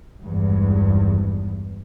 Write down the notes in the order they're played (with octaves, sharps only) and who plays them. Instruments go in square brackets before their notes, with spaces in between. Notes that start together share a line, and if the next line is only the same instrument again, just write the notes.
[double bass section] G#1 E2 G2